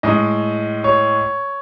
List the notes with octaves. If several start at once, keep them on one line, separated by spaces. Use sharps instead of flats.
A2 G#3 D#5
C#5